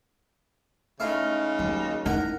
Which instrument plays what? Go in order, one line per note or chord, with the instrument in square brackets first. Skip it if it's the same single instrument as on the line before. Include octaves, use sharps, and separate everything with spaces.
[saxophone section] C#3 G#3 D#4 [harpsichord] A3 E4 F5
[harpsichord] D#2 [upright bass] F#3
[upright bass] D#4 E4 [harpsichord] A#4 F#5